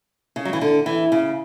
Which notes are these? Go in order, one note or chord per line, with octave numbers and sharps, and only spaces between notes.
C#3
F#3
E3
D3
E3
C#3